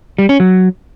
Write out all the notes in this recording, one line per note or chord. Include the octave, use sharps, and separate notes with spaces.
G3
C#4
F#3